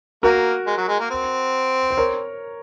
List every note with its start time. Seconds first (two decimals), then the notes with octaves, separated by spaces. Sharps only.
0.23 A#3 F#4 A#4
0.66 G#3
0.77 F#3
0.88 G#3
1.00 A#3
1.10 C4
1.91 C5
1.97 A#4 C#5